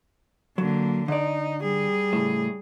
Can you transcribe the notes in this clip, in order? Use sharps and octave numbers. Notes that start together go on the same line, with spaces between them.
D3 F#3 A#3
D3 D#4 D5
G3 G#4
A2 C#3